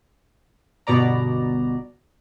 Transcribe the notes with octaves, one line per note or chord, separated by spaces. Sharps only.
G1 B2 B3 D5 A#5